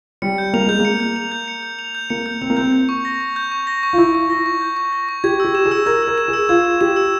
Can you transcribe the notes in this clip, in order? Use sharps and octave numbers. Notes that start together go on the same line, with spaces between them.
G3 C#7
G6
A#3 F7
G#3 G6
A#3 C#7
G6
F7
G6
C#7
G6
F7
G6
A#3 C#7
G6
C4 F7
A#3
C4 G6
G6
C#6
A#6
C#6
G6
C#6
A#6
C#6
F4
E4 G6
C#6
A#6
C#6
G6
C#6
A#6
C#6
G4 G#6
G4 E6
E7
G#4
E6
A#4 G#6
A#4 E6
E7
G#4
E6
F4 G#6
E6
G4 E7
E6